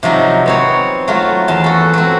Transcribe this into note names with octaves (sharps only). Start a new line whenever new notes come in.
C3 F3 F#3 D#4
B3 C4 C#5
F#3 A3 F4
E2 A5
F#4 A4
F#3 C4